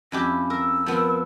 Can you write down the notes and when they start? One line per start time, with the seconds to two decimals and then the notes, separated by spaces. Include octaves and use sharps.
0.12 F2 C#4 E4 G4
0.50 A#4 E6
0.86 F3 B3 A#4